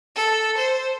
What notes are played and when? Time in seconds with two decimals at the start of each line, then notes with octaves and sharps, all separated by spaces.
0.16 A4
0.57 C5